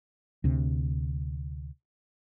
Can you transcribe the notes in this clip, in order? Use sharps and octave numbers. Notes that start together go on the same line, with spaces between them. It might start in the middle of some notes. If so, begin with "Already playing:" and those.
D2 C3